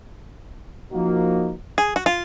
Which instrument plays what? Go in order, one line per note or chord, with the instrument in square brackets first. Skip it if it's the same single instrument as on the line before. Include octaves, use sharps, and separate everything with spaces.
[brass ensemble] F3 A#3 D#4 F#4
[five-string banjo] G#4
F#4
F4